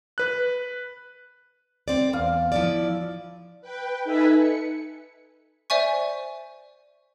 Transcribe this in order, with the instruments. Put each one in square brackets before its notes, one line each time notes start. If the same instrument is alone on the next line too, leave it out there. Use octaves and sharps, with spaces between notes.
[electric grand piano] B4 F#6
[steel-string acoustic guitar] C4 D5
[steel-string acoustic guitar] E2 [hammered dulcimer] F5
[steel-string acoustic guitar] F3 E4 D5
[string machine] B4 G5
D#4 A4 B4 E5 G#5 B5
C#7
[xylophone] C5 D5 E5 G#5 C#6